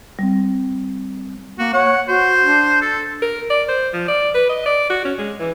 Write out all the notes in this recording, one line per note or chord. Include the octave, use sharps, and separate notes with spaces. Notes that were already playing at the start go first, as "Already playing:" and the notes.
G3 C4
A#3 F#4
C#5 F#5
F#4 C5
D4
A4
A#4
D5
C5
F3
D5
B4
D#5
D5
F#4
C#4
G#3
E3